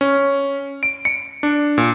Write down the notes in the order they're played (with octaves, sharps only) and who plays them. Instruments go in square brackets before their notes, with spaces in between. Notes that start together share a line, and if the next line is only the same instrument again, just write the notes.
[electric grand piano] C#4
D7
C#7
D4
A#2